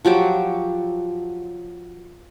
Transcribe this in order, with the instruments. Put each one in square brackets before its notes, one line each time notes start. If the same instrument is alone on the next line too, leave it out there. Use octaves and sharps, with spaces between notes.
[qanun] F3 F#3 G4 D6